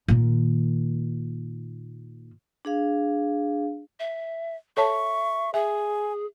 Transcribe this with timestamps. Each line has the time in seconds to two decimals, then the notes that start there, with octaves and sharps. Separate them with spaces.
0.08 A#2 D#3
2.65 D4 G#4 F5
4.00 E5
4.77 A4 C#5 E5 A5 C#6
5.54 G#4 E5 G#5